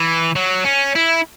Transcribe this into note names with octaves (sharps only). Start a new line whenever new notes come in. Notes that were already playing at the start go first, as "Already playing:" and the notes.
Already playing: E3
F#3
C#4
E4